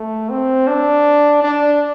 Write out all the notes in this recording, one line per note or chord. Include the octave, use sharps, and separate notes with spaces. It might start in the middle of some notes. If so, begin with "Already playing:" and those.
Already playing: A3
C4
D4
D4